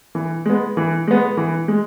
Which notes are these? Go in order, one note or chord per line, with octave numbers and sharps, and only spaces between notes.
E3
G#3 B3
E3
G#3 B3
E3
G#3